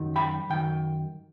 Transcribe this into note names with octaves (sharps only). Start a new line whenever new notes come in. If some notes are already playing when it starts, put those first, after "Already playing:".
Already playing: F#2 D#3 F#3
G5 B5
F#2 D#3 G5